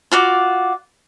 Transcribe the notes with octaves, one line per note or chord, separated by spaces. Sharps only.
F4 F#4 D5